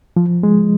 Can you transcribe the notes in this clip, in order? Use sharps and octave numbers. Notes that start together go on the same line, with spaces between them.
F3
G#3